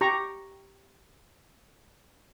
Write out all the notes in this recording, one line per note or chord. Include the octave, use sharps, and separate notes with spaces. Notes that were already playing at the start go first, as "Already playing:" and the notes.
G4 A#5 C#6